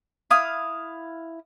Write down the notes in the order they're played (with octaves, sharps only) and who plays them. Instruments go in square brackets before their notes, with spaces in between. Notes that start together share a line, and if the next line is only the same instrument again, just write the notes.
[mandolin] E4 F5 D#6